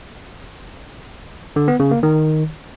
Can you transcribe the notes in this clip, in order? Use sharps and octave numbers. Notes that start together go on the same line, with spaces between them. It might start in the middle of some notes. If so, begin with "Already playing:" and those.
D3
B3
C#3
A#3
D#3